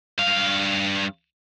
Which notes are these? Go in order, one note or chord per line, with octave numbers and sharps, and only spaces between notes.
G2 F5